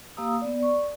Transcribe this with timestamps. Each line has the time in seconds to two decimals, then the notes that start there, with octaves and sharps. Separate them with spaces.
0.17 A#3 G4 F5 A#5 D#6 E6
0.42 B3 D5
0.60 D5 C#6